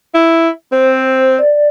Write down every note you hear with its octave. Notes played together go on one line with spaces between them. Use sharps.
E4
C4 C5
D5